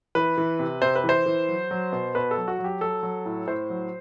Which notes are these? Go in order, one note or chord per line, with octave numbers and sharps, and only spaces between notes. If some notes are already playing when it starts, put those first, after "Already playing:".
E3 B4
E3
C3
C3 C5
B4
E3
C5
E3
F#3
F#3
B2
B2 B4
A4
F#3
F#4
F#3
G4
F#3 A4
F#3
A2
A2 C5
F#3